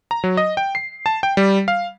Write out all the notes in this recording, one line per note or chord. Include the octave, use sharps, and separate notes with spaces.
A#5
F#3
D#5
G5
C7
A5
G5
G3
F5